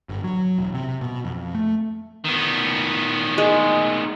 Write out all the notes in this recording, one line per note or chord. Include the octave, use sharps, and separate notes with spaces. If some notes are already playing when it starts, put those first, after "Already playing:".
G1
F#3
E1
C3
B2
F2
A3
D#3 B3
G#3